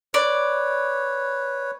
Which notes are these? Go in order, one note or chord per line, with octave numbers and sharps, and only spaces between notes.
B4 C#5 D5